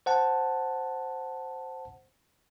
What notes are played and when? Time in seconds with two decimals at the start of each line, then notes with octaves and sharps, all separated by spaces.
0.06 C5 F#5 A5